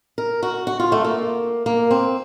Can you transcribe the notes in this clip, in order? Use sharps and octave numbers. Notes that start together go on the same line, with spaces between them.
A#4
F#4
F#4
F4
A3
A#3
A#3
C4